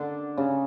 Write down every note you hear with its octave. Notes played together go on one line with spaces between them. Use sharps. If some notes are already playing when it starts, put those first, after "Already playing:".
Already playing: D3
C#3